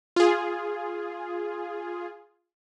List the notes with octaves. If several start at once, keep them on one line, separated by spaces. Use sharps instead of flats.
F4 G#4